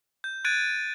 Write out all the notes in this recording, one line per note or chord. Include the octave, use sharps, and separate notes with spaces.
G6
F#6 G#6 A6 D7 D#7